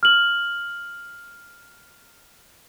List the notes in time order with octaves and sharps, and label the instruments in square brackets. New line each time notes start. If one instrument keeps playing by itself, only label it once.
[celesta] F6 F#7